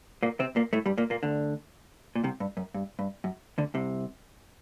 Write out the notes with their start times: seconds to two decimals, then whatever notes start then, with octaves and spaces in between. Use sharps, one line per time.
0.23 A#2 A#3
0.40 C3 C4
0.56 A#2 A#3
0.73 A2 A3
0.86 G2 G3
0.98 A#2 A#3
1.10 A#2 A#3
1.23 D2 D3
2.15 A#2
2.24 C2 C3
2.40 G2
2.57 F#2
2.74 G2
2.99 G2
3.24 F#2
3.58 D2 D3
3.74 C2 C3